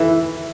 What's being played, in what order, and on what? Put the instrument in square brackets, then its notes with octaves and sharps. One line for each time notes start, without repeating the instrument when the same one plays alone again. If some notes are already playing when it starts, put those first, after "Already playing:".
Already playing: [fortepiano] E3 E4